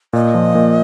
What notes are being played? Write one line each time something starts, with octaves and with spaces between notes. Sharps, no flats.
A#2 D#5
F3
A#2